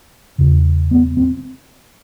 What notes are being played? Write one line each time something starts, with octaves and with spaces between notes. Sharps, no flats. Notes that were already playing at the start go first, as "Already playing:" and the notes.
E2 C#3
B3
C4